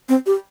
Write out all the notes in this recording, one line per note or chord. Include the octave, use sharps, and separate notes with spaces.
C4
G4